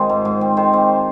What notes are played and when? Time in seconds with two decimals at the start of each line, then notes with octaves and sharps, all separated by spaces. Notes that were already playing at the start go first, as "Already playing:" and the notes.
Already playing: D#3 G#3 C4 F4 G#4 A#4
0.09 G#2
0.25 G#2
0.41 C4
0.57 D#3 C5
0.73 C4